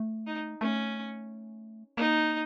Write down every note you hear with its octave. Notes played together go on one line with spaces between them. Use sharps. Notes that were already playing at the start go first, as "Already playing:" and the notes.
Already playing: A3
D#4
A3 C#4
A#3 D#4